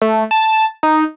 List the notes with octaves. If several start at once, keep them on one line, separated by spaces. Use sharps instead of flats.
A3
A5
D#4